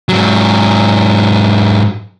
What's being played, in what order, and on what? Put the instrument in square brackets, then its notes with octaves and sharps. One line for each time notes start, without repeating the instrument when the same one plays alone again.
[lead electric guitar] G#2 F#3